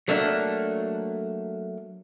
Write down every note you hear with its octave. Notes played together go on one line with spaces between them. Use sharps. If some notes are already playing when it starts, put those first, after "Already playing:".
F#3 A3 A#3 D4